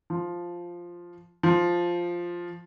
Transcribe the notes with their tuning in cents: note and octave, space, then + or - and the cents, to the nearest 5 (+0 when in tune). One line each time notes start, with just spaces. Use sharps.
F3 +0
F3 +0